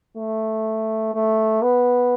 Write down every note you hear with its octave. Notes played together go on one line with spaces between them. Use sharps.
A3
A3
B3